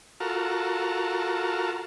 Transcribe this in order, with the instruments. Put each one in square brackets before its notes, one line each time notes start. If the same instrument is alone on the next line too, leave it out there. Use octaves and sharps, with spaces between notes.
[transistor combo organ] F4 F#4 A4 A#4